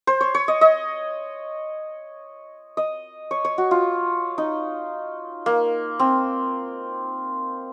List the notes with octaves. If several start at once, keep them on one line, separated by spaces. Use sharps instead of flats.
C5
C#5
C#5
D#5
D#5
D#5
C#5
C#5
F#4
F4
D#4
A#3
C4